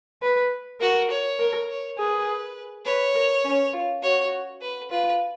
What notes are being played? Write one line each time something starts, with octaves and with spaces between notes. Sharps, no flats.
B4
F#4 A#4
C#5
A#4
C#5
G#4 B4
B4 C#5
A#4
C#4
F4
F#4 C#5
B4
F4 B4